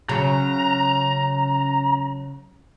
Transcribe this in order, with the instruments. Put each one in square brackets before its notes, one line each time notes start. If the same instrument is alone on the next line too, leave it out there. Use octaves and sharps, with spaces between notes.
[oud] C#3 F#3 [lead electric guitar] A#5